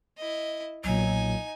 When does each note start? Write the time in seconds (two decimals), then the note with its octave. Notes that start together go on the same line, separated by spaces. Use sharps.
0.18 E4 D#5
0.84 B1 A#2 F#3 D#4 G#5